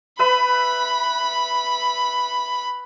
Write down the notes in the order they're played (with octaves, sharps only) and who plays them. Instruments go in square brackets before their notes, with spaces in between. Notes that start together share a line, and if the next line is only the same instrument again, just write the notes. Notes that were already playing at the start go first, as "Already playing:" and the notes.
[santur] B4 E5 [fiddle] B5